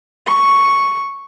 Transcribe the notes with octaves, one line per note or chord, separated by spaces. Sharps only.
C#6